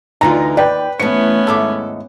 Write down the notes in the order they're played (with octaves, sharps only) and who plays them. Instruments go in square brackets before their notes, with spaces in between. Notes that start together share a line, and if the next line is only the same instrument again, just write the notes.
[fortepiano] D2 F4 [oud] D3 E3 D#4 [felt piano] A#5
[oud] D#2 [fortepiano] B4 [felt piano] D5 G5
[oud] E3 A3 [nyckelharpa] B3 C#4 [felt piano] C#7
[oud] D#2 G#2 E5 [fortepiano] A4 D6